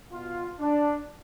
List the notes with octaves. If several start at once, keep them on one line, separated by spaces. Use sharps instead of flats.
B2 F4
D4